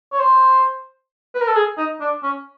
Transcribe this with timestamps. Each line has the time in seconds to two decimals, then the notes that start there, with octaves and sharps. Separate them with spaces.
0.12 C#5
0.20 C5
1.34 B4
1.41 A#4
1.48 A4
1.56 G#4
1.78 D#4
2.00 D4
2.23 C#4